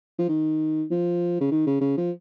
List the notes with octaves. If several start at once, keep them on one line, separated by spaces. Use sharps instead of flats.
F3
D#3
F3
C#3
D#3
C#3
C#3
F3